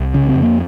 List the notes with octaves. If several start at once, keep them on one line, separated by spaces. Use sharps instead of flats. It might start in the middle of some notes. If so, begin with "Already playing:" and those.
Already playing: C2
C#3 C#4
C4
F2
A#3